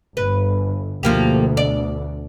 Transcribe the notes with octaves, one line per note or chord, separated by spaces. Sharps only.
G1 B4
D2 B2 F3 A#3 G4
D5